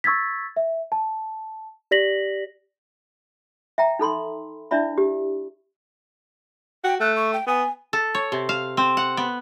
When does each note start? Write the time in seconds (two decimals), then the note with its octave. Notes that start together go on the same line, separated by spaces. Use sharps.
0.04 C#6 E6 G#6 A6 B6
0.57 E5
0.92 A5
1.91 G4 D5 A#6 B6 F#7
3.78 E5 G5 A#5
3.99 D#4 A4 B5 C6
4.71 D4 E4 D5 E5 B5
4.98 G4
6.84 F#4 G5
7.00 A3 F#6
7.15 C#6
7.33 G5
7.47 B3 G#5
7.93 A4
8.15 C#5
8.32 C3
8.49 F5
8.77 C4
8.97 F#5
9.17 B3